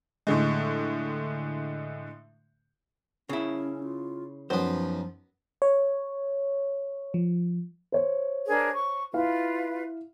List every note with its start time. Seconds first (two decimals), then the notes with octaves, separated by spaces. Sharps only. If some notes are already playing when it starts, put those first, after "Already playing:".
0.27 A2 D3 G#3
3.29 C#3 C#4 E4
3.83 F4
4.50 F#2 F3 B3 D#4 C5
5.62 C#5
7.14 F3
7.92 C5 C#5
8.47 D4 G#4 A#4
8.74 C#6
9.13 E4 F4 B4 F5